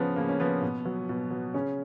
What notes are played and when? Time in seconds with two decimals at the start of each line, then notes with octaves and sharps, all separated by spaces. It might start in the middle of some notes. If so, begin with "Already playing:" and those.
Already playing: C#3 F3 B3 C#4
0.16 C#3 A#3
0.29 C#4
0.40 F3 B3
0.62 B2
0.85 F#3
1.09 B2
1.31 F#3
1.54 C#3 C#4